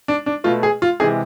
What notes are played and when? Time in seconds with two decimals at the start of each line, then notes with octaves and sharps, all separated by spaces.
0.08 D4
0.26 D4
0.44 B2 A3 F4
0.63 G#4
0.82 F4
1.00 C3 E3 G#3 G#4